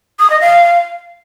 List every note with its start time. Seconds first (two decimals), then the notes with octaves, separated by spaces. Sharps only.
0.19 D#6
0.30 D#5
0.41 F5